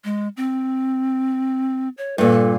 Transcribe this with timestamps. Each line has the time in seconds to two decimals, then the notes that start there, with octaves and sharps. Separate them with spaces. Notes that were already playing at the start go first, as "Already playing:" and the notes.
0.05 G#3
0.37 C4
1.98 C#5
2.18 G2 A#2 A4